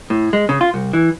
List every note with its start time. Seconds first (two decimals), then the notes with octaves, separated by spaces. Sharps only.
0.10 A2
0.33 G#3
0.49 C#3
0.61 F4
0.74 C2
0.93 E3